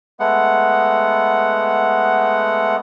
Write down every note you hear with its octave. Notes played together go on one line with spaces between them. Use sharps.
G#3 A3 B3 F#5